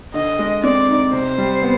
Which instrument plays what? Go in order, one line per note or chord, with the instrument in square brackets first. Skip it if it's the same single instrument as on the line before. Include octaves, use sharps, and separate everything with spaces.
[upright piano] D3 [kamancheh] D#5
[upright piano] G#3
[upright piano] C4 [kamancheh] D5
[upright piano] D#4
[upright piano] C3 [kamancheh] C5
[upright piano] G3
B3